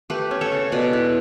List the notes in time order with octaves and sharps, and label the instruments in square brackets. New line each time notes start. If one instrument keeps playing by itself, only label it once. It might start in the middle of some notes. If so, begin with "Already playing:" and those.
[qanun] A3 G4 B4
C#4
A4 C#5
C#3
B2 B4 D5
E4